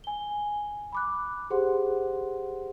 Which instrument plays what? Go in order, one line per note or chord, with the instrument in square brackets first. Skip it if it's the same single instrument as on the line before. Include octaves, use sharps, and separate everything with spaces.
[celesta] G#5 G7
B5 D6 F#6
G4 G#4 C5 F#5 C6